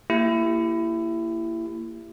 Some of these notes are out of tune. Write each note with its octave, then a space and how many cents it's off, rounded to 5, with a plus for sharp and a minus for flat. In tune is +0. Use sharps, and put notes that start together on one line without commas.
A#3 -20 E4 +20 G4 +0